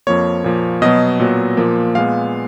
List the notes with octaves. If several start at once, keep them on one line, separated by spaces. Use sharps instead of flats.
F2 F3 A#3 C#5
A#2 F3 A#3
B2 F#3 B3 D#5
A#2 F#3 B3
A#2 F3 A#3
A#2 G#3 B3 F5